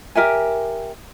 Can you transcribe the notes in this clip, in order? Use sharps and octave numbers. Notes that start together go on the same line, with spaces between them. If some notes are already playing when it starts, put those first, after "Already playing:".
G4 A#4 E5 G#5